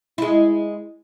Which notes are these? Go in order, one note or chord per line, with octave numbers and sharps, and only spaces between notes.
G#3 E4